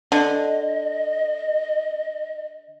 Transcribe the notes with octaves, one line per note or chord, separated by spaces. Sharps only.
D3 D#5